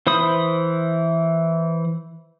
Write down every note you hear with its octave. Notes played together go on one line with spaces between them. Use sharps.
E3 C5 B5 D#6